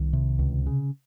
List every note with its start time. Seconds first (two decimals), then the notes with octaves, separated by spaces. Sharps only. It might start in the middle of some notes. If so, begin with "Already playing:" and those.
Already playing: C2 D#3
0.13 C3
0.39 C#2
0.66 C#3